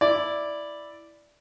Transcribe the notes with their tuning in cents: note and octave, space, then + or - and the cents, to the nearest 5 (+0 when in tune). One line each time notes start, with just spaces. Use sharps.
E4 +0 D5 +0